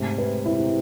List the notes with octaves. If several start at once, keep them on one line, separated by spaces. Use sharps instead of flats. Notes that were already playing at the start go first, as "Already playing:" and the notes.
Already playing: G#2 C3 A3
B4
E4